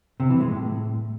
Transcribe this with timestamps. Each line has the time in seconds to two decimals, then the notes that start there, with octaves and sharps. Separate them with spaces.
0.20 C3
0.30 E3
0.40 G#3
0.51 A2